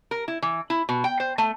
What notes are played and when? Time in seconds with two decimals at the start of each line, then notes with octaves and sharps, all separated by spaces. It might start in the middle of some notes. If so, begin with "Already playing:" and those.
0.11 A#4
0.28 E4
0.42 E3
0.70 E4
0.89 B2
1.04 G5
1.20 C5
1.38 A3